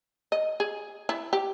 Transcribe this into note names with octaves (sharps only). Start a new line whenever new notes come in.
D#5
G#4
E4
G4